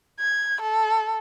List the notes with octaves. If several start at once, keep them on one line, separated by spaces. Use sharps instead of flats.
G#6
A4